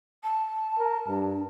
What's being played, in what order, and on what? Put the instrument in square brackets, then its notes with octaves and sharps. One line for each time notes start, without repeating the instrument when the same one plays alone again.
[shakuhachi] A5
[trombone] A#4
[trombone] G2 [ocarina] D4